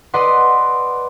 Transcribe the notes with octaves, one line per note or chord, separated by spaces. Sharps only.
B4 D5 D#5 F#5 C6